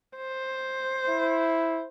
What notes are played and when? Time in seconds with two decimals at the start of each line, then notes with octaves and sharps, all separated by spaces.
0.17 C5
1.09 E4